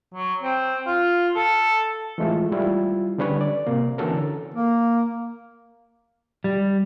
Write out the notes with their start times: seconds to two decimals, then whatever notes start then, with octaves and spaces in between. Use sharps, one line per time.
0.14 F#3
0.42 C4
0.86 F4
1.36 A4
2.18 E3 G#3 A3 F4
2.52 G3 E4 F4
3.18 D3 G3 C#4 B4 C#5
3.41 D5
3.67 C3 A#3
3.98 D3 E3 C#4 F#4 A4 A#4
4.54 A#3
6.44 G3